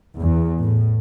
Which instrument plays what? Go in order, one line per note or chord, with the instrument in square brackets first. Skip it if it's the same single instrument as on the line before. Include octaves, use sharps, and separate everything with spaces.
[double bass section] E2
A2